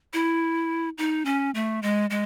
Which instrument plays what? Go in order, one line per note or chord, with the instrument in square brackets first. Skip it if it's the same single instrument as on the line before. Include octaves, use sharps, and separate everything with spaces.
[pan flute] E4
D#4
C#4
A3
G#3
G#3